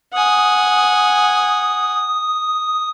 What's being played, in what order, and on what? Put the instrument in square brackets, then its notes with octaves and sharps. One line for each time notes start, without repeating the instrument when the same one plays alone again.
[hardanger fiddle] F#5 G#5 [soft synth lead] D#6